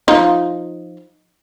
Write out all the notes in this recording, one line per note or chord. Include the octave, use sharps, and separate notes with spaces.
F3 D#4 F4